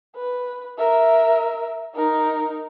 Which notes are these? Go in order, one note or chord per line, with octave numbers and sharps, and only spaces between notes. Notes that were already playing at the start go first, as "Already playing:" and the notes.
B4
A#4 E5
D#4 A#4